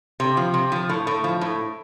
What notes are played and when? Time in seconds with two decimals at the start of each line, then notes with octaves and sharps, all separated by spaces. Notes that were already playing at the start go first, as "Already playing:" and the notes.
0.20 C3
0.37 F3
0.54 C3
0.72 F3
0.89 A2
1.07 A2
1.24 F3
1.41 A2